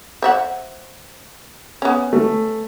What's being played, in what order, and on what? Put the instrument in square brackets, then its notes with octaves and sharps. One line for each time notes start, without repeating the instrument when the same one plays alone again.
[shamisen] C5 E5 F#5
B3 C#4
[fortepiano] A3